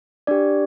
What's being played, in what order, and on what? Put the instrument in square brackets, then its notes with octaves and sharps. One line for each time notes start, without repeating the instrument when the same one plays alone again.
[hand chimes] D4 G4 D5